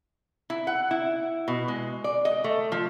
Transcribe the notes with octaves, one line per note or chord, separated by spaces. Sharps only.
E4
F#5
E4
B2
G#3
D5
D#5
A3
F3